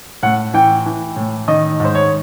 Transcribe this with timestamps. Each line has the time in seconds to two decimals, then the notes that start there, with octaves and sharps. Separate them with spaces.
0.23 A2 F#5
0.54 E3 G5
0.86 E3
1.16 A2
1.48 D#3 D#5
1.80 G#2 C5
1.95 C#5